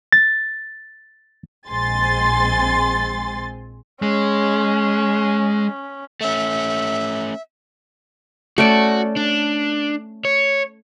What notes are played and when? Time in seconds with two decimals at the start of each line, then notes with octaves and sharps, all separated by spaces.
0.12 A6
1.69 A#1 G#3 C4 G#5 C6 A6
4.02 G#3 C#4
6.21 A3 C#4 E5
8.58 A3 C#4 F#4 D5
9.16 D4
10.25 C#5